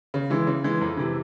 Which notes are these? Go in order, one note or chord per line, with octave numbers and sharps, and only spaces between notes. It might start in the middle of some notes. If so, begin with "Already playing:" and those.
C#3
E3 G#3
C#3
E3 G#3
F2
C3 E3